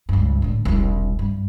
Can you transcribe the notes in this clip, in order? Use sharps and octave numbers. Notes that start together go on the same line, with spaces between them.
C#2 G2
A2 D3
E1 C2
G2